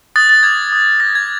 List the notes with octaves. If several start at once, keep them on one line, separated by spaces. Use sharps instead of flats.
D#6 F#6 A6
A6
D6 F6 G#6
D#6 F#6
D#6 G6 A#6
G#6